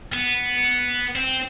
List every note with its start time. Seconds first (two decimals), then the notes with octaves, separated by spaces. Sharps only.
0.13 B3
1.15 C4